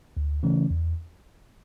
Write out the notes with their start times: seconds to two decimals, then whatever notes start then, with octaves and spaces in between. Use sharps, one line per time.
0.17 D2
0.43 C#3 E3 A3 C#4
0.70 E2